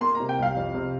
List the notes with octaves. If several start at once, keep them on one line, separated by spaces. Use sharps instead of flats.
A#3 C6
A#5
C3
G5
C2 F5
F2
C3